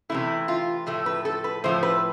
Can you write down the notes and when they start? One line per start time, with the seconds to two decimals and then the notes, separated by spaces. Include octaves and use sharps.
0.10 C3 E3 A3 E4
0.48 F4
0.87 A2 F3 A3
1.06 B4
1.25 A4
1.44 B4
1.64 A2 F3 A3 C5
1.83 B4